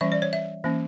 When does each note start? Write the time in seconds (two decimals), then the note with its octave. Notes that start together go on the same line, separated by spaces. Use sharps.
0.01 E3 G3 C#4 E5
0.12 D5
0.22 C#5
0.33 E5
0.64 E3 A#3 C#4